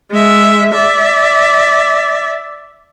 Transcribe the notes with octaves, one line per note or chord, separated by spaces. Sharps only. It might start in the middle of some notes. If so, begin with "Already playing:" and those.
G#3 E5
D5 E5